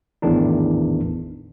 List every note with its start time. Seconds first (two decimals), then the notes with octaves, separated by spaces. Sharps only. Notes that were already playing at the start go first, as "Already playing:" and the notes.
0.22 G#1 E2 A2 D#3 D4 D#4